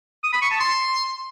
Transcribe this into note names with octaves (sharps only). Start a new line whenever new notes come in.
D#6
B5
C#6
A5
C6